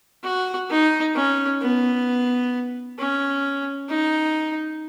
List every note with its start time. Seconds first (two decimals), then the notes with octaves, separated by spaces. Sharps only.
0.24 F#4
0.70 D#4
1.15 C#4
1.61 B3
2.99 C#4
3.89 D#4